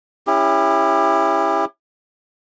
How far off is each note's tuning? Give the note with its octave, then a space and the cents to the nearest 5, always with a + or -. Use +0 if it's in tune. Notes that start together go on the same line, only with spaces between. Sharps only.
C#4 +0 E4 +0 G4 +35